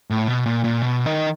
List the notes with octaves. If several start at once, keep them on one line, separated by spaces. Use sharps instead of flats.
A2
B2
A#2
A#2
B2
D#3